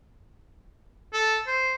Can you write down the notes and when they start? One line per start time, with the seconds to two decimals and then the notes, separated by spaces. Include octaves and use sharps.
1.13 A4
1.47 C5